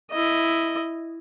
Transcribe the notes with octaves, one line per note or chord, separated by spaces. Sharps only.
E4 D#5